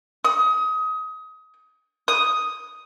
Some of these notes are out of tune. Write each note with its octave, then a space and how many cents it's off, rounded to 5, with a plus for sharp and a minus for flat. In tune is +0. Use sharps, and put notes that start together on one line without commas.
D#6 +25
D#6 +5